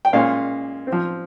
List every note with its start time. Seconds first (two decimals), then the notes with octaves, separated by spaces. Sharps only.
0.05 G5
0.13 A#2 G#3 C#4 F5
0.87 C4
0.92 F3